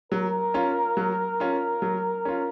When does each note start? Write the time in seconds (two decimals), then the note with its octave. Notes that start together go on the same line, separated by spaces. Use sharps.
0.12 F#3 A#4
0.54 C#4 F4
0.97 F#3
1.40 C#4 F4
1.82 F#3
2.25 C#4 F4